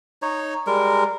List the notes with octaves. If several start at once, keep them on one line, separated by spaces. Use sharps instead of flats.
D#4 C#5
G3 G#3 A#4